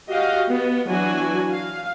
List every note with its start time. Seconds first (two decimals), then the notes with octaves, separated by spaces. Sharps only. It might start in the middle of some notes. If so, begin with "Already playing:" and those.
0.11 F#4 G4 D#5 F5
0.48 B3
0.88 E3 F#3 D4 F#4 G#5
1.51 F5